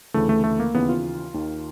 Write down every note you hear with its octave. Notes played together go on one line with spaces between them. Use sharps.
D2 C#3 E3 A3
A3
A3
A#3
D#2 C#3 E3 B3
F4
D#2 D#3